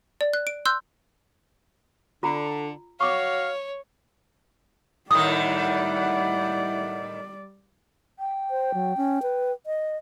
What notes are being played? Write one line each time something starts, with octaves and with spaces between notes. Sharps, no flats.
D5
F#6
D7
C6 E6 F#6 G6
D3 F4 A#5
F#4 C#5 F5 C#6 D6
A2 D#3 G3 E4 D5 F#5 D#6
G5
C5
F#3
C#4
B4
D#5